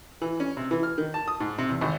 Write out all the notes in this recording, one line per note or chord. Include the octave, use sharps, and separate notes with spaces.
E3
C#4
C3
E3
F6
D#3
A5
D#6
G#2
C3
E2
G#1